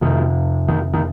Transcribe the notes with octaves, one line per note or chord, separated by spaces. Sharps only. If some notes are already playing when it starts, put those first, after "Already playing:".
F2 C3 D#3
D#3
D#3